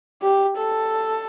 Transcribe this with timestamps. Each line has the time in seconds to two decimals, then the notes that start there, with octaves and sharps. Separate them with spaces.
0.22 G4
0.57 A4